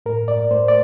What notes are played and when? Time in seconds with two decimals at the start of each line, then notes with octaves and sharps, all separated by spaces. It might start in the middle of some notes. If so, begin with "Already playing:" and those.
0.06 A2 A#4
0.28 D5
0.51 A3 C5
0.68 D5